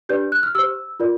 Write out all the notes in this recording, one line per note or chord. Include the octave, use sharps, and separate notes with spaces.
D4 G4 B4 D5 G6
F#6
F6
G4 C5 E6
F4 A#4 D5